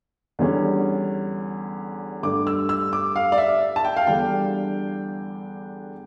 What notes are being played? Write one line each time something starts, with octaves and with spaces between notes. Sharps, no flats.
E2 D3 G3 C#4
G2 D3 A3 D6
E6
E6
D6
F5
D5
E5
A5
G5
F5
E2 D3 G3 D4 G5